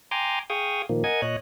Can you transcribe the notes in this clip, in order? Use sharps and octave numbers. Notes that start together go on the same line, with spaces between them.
G5 G#5 A#5 C6 D6
G#4 F5 G5 C#6 D#6
A#2 D#3 F3 A#3
A#4 D#5 F#5 G#5 G#6
A#2 C#5 D#5 F#6